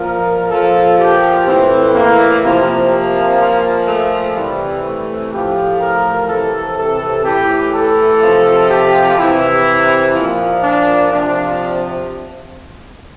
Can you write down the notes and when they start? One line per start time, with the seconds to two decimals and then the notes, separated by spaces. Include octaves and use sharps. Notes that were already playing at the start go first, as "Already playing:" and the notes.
Already playing: A#2 F3 A#4
0.49 A#2 F3 A4
0.98 G4
1.46 A2 E3 C4
1.93 A#3
2.42 C3 F3 A#3
3.39 A#2 F3
3.86 A3
4.34 C3 E3 G3
4.83 A3
5.31 A2 F3 G4
5.80 A#4
6.28 C3 E3 A4
6.76 A4
7.24 A2 E3 G4
7.72 A4
8.21 C3 F3
8.69 G4
9.17 C3 E3 E4
10.14 A#2 F3
10.62 D4
11.10 C3 F3 D4